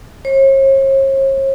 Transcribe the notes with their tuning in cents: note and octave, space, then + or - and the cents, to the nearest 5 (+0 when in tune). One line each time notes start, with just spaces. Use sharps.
C#5 -45